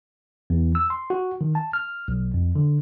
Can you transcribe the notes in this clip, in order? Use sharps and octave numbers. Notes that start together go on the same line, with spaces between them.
E2
E6
C6
F#4
D#3
A5
F6
B1
F2
D3